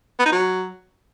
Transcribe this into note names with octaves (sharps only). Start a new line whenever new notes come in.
B3
D#4
F#3